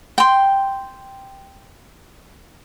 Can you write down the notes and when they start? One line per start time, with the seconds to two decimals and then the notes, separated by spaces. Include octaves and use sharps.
0.18 G5 C6